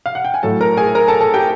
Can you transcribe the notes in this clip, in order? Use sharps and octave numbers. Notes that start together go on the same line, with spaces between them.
F5
F#5
G5
G#5
A2 F#3 A4 A5
A#4 A#5
G#4 G#5
A#4 A#5
A4 A5
A4 A5
G4 G5